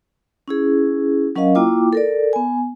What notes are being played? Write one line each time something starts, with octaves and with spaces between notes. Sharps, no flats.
C#4 E4 G#4
F#3 C#4 A#4 D#5 F5
A#3 E4 F4 G5 D6
A4 A#4 D5
B3 G#5